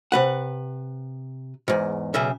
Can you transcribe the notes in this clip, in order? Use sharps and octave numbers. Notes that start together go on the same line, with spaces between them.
C3 B4 F#5
E2 G#2
B1 C#3 E5